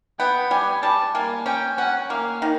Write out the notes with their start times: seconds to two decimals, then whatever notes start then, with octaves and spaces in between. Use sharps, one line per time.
0.19 B3 G5
0.51 G3 G#5
0.82 G3 A5
1.14 A#3 G#5
1.46 C#4 G5
1.78 C#4 F#5
2.10 A#3 F5
2.42 D#3